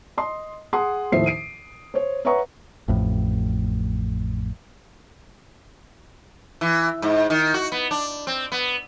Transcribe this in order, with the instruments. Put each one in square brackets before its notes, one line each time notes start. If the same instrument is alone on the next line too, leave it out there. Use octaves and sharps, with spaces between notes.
[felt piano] D#5 C6
G#4 F#5 C6 D#6
D#2 A2 F3 C5 E5 C7
C7 D7 D#7
C5 C#5
B4 C#5 E5 F#5 A#5 C#6
[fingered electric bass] A1 F2 A2
[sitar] E3
G#2
D#3
F#4
B3
D4
C4
B3